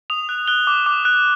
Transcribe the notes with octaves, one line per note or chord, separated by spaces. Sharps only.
D#6 F7
F#6
F#6 G7
D6
D6
F#6